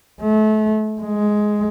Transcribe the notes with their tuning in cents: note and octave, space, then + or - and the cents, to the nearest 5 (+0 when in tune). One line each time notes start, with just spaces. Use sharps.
A3 -30
G#3 +10